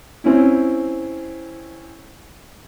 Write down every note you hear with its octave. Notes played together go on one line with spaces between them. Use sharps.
C4 C#4 E4